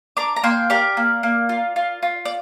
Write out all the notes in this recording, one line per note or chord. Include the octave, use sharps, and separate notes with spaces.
D4 A#5 D6
A#5
A#3 G5 C6
G4 A#4 D5
A#3
A#3
F4
F4
F4
D5